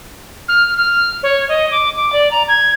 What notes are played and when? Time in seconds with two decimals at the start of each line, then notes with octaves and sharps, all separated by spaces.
0.48 F6
0.77 F6
1.23 C#5
1.49 D#5
1.71 D6
1.96 D6
2.13 D5
2.31 A#5
2.48 G#6